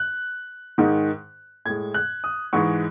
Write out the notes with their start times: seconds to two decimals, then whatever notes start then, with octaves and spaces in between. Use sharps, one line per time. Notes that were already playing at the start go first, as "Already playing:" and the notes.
Already playing: F#6
0.78 G#2 D#3 G#3
1.65 A2 G#3 G#6
1.94 F#6
2.24 D#6
2.53 G#2 E3 G#3 C#6